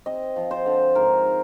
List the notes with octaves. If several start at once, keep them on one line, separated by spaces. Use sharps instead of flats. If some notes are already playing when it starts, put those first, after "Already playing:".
C4 D#5
F3
C5
D3
G#2 A#4